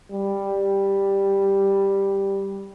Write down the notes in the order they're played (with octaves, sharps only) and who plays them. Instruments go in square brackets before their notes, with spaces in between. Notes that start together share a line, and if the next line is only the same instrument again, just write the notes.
[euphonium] G3